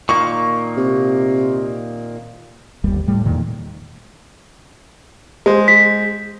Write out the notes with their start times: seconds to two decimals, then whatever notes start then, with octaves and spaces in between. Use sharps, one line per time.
0.09 A#2 D#3 A#3 C#6
0.77 C3
2.84 G1 D#2 G3
3.07 A2 G3 A3
3.25 E2 A#2 D#3
5.46 G#3 C5
5.68 B6